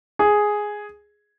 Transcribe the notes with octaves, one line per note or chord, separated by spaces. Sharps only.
G#4